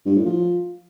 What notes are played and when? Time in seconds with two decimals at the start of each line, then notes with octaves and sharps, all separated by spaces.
0.06 G2
0.16 A2
0.25 F3